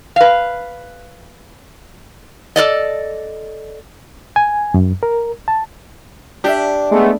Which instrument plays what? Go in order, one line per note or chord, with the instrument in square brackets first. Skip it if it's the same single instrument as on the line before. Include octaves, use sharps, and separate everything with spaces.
[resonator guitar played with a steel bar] B4 F5
A4 A#4 D5 D#5
[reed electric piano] G#5
F#2
A#4
A5
[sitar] D4 [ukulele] G4 E5
[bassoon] G#3 [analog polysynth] A3 B3